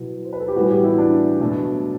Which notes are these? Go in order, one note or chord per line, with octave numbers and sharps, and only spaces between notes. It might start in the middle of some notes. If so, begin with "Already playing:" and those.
Already playing: B2 F#3 B3 E4
C5
B4
A4
G4
A2 E3 G3 B3 F#4
G4
E4
D4
B2 F#3 A3